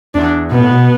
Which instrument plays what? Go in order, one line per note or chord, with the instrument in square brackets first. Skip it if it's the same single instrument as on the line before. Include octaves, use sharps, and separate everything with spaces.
[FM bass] E2 [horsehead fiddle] D4
[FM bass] B2 [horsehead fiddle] B3
[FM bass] A2
B2